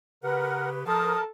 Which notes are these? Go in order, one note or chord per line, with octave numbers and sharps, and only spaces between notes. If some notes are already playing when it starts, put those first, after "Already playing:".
C#3 G4 A#4 B4 F#5
F3 A4 A#4 A5 D#6